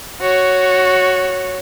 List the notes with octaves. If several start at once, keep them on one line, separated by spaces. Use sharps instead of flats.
F#4 C#5